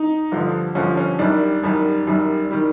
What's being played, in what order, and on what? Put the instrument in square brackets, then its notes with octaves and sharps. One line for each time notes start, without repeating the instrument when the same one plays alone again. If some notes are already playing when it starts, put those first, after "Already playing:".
Already playing: [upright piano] D#4
G2 D3 F3
G2 D3 F3 C#4
C#4
F#2 D#3 G3 D4
F#2 D#3 G3
F#2 D#3 G3
D#3 G3